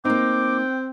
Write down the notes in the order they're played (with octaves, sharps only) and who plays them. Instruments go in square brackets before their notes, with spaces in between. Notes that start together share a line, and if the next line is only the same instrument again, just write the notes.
[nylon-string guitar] A#3 D#4 [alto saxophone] C4 [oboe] G5 [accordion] D6